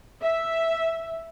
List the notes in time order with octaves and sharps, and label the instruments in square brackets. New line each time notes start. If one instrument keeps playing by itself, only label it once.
[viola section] E5